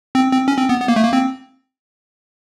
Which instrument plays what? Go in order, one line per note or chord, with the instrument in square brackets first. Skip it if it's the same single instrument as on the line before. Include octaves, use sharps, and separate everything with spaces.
[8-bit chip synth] C4
C4
C#4
C4
B3
B3
A#3
A3
A#3
C4